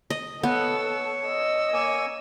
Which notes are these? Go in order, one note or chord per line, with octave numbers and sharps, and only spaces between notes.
D#5
B3 A4 C#5 E6
D#5 E6
A#3 C#5 G#5